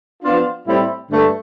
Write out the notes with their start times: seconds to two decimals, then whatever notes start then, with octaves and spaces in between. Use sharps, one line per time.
0.22 F3 B3 D4 F4
0.66 A2 G3 C4 E4
1.09 G2 D3 A3